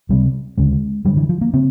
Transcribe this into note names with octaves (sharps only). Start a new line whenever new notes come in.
C#2 C3 G3
D2 C#3 G#3
F#2 D3 G3
E3
F3
A#3
C#3 C4